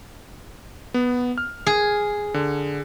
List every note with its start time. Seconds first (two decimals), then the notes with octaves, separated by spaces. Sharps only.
0.94 B3
1.38 F6
1.67 G#4
2.34 D3